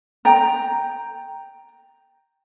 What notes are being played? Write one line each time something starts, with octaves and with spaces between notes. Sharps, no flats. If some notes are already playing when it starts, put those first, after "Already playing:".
G5 A#5